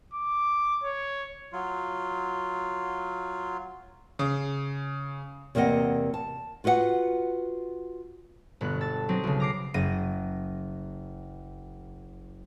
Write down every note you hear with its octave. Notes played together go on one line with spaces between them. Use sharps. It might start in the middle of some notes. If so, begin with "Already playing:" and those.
D6
C#5
F#3 F4
C#3
E2 C3 A#3 D4 D#5 F#5
A5
F4 F#4 B4 D5 F#5
G1 B2 B3 F#6
A5 E6 A6
F#3 C4 D#4
B1 C#3
A#5 D6 C7
F#1 A#6 D#7